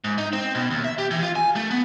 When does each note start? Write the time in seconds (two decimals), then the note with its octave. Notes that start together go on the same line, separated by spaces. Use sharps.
0.04 G#2
0.18 D#4
0.33 C4
0.55 B2
0.70 D#2
0.84 E5
0.98 G4
1.11 E3
1.22 F4
1.36 G#5
1.56 A3
1.71 B3